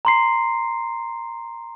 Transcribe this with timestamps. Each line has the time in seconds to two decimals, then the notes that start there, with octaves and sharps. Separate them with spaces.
0.05 A#5 C6 C7